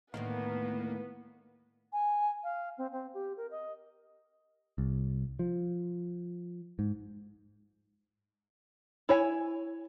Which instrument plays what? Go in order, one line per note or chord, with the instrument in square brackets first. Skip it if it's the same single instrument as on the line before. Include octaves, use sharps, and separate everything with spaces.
[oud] D2 A2 D#3 [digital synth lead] A#3 [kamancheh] B3 B4
[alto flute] G#5
F5
C4
C4
G4
A#4
D#5
[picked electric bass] C2
F3
G#2
[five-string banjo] E4 C#5 G#5